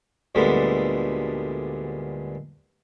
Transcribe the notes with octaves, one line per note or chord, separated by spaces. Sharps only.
D2 A#2 G3 G#3 B3 A4